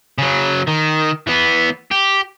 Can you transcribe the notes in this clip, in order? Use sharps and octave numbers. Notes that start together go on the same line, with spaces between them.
C#3 F#3
D#3
E3 B3
G4